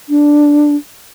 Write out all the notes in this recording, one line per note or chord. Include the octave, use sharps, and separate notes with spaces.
D4